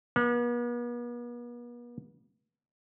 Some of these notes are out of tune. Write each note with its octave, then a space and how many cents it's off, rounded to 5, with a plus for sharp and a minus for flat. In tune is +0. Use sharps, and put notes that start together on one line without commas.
B3 -45